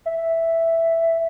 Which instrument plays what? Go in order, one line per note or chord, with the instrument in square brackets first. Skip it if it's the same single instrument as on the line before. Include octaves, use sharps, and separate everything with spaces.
[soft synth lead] E5